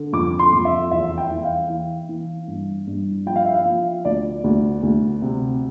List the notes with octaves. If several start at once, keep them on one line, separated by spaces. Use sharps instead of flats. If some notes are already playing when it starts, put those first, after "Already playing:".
Already playing: D3
F2 D6
C6
F2
E5
E2 E5
G5
E3
F5
E3
E3
G2
G2
F3 G5
F5
E5
F5
F3
D2 D5
D2
D2
C3